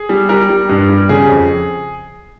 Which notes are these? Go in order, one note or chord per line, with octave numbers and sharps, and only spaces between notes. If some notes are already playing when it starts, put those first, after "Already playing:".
Already playing: G#4
G3
G3 A#4
G3
G2
G3
C#3 G#4
F2